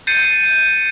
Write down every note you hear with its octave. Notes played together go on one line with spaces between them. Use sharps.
G6 A6 C7 C#7 D#7